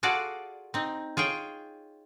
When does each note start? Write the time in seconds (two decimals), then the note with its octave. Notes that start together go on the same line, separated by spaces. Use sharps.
0.03 F4 F#4 G#4 A4 D5
0.74 C4 D#4
1.17 F4 G#4 C#5 G5